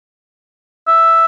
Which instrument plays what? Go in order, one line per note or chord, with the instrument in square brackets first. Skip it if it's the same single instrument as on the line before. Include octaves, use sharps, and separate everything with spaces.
[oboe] E5